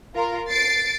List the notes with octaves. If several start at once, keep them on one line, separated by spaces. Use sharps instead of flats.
F4 A#4
A6 C7 D7